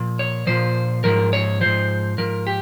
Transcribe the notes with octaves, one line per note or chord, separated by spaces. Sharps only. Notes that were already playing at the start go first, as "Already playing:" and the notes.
Already playing: A#2 F3
C#5
A#2 F3 C5
G#2 F3 A#4
C#5
G#2 F3 C5
G#2 F3 A#4
G4